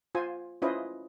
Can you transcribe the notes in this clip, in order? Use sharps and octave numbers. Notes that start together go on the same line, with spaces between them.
F4 C5 G#5
C#4 E4 F4 B4 C5 D#5